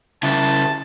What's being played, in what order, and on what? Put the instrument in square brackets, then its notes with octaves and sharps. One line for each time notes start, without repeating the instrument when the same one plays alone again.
[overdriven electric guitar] C#3 E4 [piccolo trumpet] A5